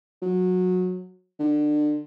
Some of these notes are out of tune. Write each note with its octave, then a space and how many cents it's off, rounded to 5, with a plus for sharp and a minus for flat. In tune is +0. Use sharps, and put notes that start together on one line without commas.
F#3 -20
D3 +25